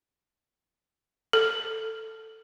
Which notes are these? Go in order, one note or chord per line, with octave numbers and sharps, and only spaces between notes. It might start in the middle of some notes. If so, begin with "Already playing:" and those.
A4